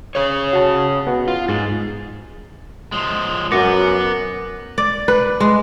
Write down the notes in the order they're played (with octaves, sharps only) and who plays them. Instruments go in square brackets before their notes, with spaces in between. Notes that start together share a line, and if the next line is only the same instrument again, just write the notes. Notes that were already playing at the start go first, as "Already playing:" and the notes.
[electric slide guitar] C#4 G#4 C#5
[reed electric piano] F#4 A5
B3 F#4
[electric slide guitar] F4
[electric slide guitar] G#2 D#4 [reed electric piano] G#3 A6
[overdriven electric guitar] F3 G#3
[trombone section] F#2 [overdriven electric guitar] B3 [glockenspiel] D6 A#6 C#7
[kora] D5
B4
G#3